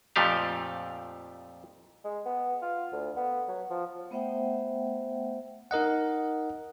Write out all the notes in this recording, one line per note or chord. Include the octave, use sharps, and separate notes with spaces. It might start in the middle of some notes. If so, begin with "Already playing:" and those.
F2 A#2 F3 A3 G4 F5
G#3
B3
F4
D2
B3
F#3
F3
A3 B3 C5 E5 F#5 G5
D#4 A#4 D#5 F#5